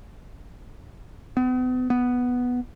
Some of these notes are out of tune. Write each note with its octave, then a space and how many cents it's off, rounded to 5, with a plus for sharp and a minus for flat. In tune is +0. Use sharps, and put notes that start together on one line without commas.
B3 +40
B3 +0